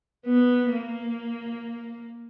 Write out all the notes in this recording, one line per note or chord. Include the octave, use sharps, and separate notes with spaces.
B3
A#3